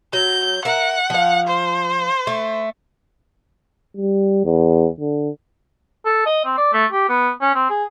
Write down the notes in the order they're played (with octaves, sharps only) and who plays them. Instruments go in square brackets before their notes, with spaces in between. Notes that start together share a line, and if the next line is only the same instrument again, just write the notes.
[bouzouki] F#3 [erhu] G6
[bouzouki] A#4 E5 [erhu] F#5
[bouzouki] F3 F5
[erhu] C5
[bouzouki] A3
[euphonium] G3
E2
D3
[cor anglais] A4
D#5
C4
D5
A3
G4
B3
C#4
C4
G#4